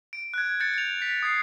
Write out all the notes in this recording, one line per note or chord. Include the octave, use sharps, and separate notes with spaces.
D7
F#6 G#6
G6 A6 C#7
C#7 F7
B6
D#6 G#6 C7